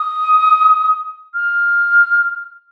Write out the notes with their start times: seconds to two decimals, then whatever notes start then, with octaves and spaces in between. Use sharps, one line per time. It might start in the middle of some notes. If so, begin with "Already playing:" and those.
Already playing: D#6
1.34 F6